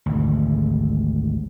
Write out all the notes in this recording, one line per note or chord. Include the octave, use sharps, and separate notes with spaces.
G#1 D2